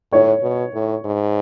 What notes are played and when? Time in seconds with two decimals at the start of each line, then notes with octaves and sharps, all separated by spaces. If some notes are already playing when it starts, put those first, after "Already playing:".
0.12 A2 C#5
0.42 B2
0.74 A2
1.05 G#2